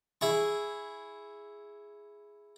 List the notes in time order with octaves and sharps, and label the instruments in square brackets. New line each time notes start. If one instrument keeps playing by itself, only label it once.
[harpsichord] E4 G#4 C#6